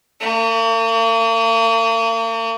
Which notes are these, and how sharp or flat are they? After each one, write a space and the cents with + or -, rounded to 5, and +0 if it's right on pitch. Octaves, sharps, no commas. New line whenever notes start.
A#3 -45